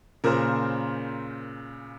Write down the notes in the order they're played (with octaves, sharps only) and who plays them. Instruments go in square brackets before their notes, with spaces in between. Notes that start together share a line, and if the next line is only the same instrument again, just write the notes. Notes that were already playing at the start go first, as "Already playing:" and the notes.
[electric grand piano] A#2 C#3 [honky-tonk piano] A#4 C5